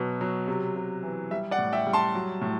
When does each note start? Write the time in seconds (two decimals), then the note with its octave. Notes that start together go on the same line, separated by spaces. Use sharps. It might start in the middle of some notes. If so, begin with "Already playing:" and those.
Already playing: B2 F#3
0.21 F#3
0.48 C3
0.76 C3
1.03 E3
1.31 G3 E5
1.51 D5 F#5
1.58 A2
1.73 E5 G5
1.86 G3
1.93 A5 C6
2.15 F#3
2.41 A2